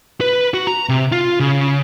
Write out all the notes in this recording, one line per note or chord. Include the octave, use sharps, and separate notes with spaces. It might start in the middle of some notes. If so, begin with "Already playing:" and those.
B4
F#4
A#5
C3
F4
C#3